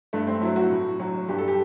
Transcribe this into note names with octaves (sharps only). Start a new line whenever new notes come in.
G2 A3
C4
F#3 E4
F#4
A2
F#3
G2 G4
A4
G4